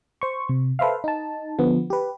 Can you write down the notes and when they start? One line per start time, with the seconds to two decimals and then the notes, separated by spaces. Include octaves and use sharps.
0.22 C5 C#6
0.49 C3
0.79 A4 B4 C5 E5 F5
1.04 D#4 A5
1.59 D3 F3 B3
1.90 G4 B4